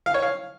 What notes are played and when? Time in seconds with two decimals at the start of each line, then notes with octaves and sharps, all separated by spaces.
0.06 F5
0.14 C#5
0.22 F5